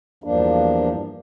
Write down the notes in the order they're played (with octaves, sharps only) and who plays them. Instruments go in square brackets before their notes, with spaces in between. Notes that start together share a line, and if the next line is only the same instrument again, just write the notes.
[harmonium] E2 G2 F3 A#3 D4